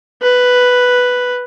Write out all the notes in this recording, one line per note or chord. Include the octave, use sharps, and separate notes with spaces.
B4